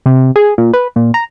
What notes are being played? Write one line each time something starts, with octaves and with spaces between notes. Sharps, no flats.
C3
G#4
A#2
B4
A#2
A#5